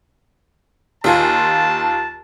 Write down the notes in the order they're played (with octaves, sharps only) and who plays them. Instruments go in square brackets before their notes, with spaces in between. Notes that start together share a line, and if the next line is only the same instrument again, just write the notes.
[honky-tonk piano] D#2 F4 G#5 [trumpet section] A5